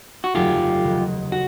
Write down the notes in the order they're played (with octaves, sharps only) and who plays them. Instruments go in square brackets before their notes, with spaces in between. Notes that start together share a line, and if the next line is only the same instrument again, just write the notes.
[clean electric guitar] F#4
[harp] G1 F2 C#3 F#3 A3 [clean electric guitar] F4 G4
[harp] F1 D#2 C#3
[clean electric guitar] F#4